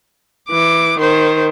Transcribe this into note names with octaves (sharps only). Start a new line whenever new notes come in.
E3 D6
D#3 C5